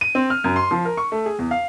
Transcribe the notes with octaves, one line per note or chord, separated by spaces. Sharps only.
D#7
C4
F6
F#2
C6
F3
A#4
C#6
A3
G#4
E2
F5